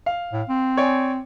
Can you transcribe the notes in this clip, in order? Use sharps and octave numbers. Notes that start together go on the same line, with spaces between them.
F5
A2
C4
C#5 D5 G#5